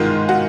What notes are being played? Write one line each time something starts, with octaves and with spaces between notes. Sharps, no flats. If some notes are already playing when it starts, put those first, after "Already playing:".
Already playing: G#2 D#3 G#3 F4
F#4